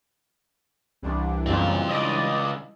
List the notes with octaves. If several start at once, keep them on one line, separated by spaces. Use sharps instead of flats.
C2 E3 G3 D4
F#2 A#2 C#3 C4 F4
C#2 D5 D#5